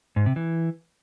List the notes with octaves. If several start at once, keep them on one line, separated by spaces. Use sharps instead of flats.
G#2
C3
E3